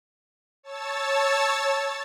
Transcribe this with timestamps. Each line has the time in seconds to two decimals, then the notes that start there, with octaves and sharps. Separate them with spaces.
0.63 C#5 A5 E6 A6